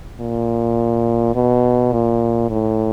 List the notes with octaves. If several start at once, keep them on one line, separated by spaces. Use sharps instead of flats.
A#2
B2
A#2
A2